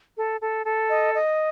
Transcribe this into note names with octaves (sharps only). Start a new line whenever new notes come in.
A4
A4
A4
D#5
D#5